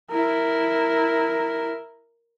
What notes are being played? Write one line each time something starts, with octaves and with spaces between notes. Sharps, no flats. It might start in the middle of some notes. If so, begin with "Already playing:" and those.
E4 A#4